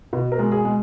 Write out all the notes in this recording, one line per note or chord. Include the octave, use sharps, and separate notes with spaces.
B2
A#4
G#3
G#4
G#3